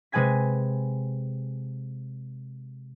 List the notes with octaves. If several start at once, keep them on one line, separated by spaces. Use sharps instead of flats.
C3 G#3 B4 G#5 G#6 B6